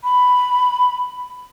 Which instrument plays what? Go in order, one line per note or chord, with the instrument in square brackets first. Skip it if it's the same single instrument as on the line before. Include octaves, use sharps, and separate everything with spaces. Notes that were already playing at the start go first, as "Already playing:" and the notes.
[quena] B5